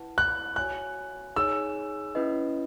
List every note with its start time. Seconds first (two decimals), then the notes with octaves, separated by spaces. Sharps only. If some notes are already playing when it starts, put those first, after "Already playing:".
Already playing: E4 B4 F#5 A5
0.18 F#6
0.56 F#4 C#5 G#5 F#6
1.36 D#4 G#4 C#5 G#5 E6
2.15 C#4 E4 B4 D#5